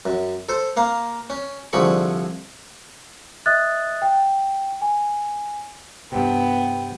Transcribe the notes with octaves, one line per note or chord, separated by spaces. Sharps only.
F#2
A4 C5
A#3 F5 A#5
C#4
C2 D3 F3 G#4 B5 C#6
D#5 E5 D#6 F#6 A6
G5
G#5
G2 C3 B3 G5